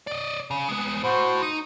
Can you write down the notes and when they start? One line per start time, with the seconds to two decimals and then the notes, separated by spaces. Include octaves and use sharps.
0.07 D5 D#5
0.51 C#3
0.69 G#3 B3
1.04 A2 F#4 C5
1.42 D#4